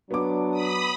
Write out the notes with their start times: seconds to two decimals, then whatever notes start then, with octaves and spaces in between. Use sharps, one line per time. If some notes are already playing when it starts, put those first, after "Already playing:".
0.11 F#3 B3 D4 D6
0.51 B5 D#6